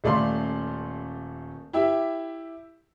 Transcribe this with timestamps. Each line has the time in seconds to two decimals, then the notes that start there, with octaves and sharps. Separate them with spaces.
0.04 D#1 A3 D5 F5 C6
1.73 E4 G4 E5